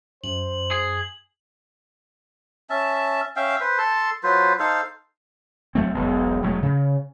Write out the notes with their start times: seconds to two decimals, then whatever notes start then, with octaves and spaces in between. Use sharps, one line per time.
0.24 F#2 C5 F#7
0.71 G#4
2.70 C#4 E5 A5
3.36 C#4 E5 F5 G5
3.61 B4 C5
3.78 A4 A5 C6
4.24 F#3 F4 B4 C5
4.59 D#4 A4 C5 F5
5.75 F#3 A3 C4
5.95 E1 B1
6.43 E1 F#3 A3
6.63 C#3